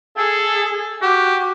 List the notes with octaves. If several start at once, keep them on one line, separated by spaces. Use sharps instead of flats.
G#4 A4
F#4 G4